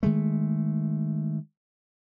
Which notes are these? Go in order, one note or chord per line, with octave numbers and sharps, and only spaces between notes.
D#3 G#3 A3